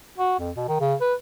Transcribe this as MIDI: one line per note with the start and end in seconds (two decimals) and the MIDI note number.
0.18 0.36 66
0.39 0.51 41
0.56 0.65 47
0.68 0.76 51
0.80 0.94 49
1.01 1.15 71